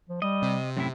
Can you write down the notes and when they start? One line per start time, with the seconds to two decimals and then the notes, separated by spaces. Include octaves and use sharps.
0.09 F3
0.22 G3 D#5
0.42 C3
0.77 F#2 A2 C4 E4